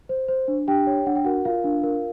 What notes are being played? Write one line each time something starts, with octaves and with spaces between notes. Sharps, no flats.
C5
C5
D4
D4 G4 G5
C#5
D4 F#5
G5
F#4 A#4 F#5
F4 A#4 F5
D4
A#4